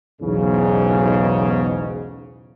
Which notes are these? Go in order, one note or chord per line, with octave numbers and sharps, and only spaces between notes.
B1 E2 G#2 C#3